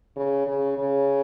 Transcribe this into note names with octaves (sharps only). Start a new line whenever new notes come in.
C#3
C#3
C#3